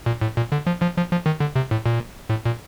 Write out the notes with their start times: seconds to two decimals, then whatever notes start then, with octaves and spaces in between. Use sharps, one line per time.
0.06 A#2
0.21 A2
0.37 A#2
0.52 D3
0.67 F3
0.82 F3
0.97 F3
1.11 F3
1.26 D#3
1.40 D3
1.56 C3
1.71 A2
1.86 A#2
2.30 A2
2.46 A#2